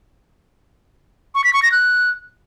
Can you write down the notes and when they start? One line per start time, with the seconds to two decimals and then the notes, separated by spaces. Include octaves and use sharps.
1.35 C#6
1.44 B6
1.53 C#6
1.63 A#6
1.72 F#6